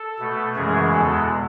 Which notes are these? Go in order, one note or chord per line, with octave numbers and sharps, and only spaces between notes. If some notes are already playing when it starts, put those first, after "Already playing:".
Already playing: A4
B2 A3
F#2 C#3 E3 G#3 G#4
E2 B2 G#3 A4